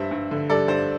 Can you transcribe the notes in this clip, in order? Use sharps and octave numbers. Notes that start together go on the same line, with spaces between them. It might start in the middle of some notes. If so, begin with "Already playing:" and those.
Already playing: G2 G3 C5 E5
G2
D3
G3 A4 D5
G2 C5